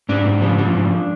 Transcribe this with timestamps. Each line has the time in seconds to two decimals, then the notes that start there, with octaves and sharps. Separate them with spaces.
0.09 G#2 D4
0.25 G#2
0.42 F3
0.58 F3
0.74 G#2